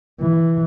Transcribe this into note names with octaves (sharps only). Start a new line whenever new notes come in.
E3